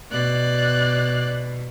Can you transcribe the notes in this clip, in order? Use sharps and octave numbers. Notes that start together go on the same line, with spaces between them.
B2 D5 F#6